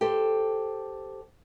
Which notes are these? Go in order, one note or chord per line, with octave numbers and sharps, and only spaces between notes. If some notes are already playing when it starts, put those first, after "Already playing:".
G4 A4 C5